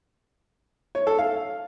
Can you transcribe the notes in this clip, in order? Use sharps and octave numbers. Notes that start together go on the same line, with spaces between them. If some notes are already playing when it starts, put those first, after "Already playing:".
C#5
A4
F5